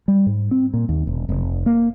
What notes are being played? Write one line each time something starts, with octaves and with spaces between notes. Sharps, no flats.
G3
G#2
C4
A#2
D#2
E1
F1
A#3